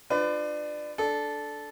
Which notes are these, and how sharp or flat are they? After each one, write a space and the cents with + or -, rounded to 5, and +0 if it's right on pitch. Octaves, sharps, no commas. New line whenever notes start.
D4 +25 F4 +10 B4 +35
D4 +0 A4 -10